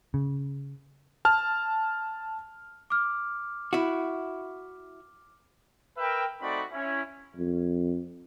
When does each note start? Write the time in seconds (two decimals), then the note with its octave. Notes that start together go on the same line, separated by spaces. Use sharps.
0.14 C#3
1.25 A5 F6
2.90 D6 F6
3.73 E4 F#4
5.97 A#4 B4 E5 G5
6.40 A3 C4 D#4 F#4 D5 B5
6.71 C#4 E4
7.36 F2